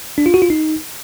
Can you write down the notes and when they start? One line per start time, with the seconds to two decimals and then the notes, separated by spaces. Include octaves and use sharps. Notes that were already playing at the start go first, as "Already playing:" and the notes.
0.18 D4
0.26 F4
0.34 F#4
0.42 F4
0.50 D#4